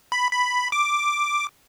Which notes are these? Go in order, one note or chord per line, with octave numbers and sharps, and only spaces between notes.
B5
B5
D6